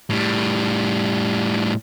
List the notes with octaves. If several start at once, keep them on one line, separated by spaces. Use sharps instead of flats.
A2 G3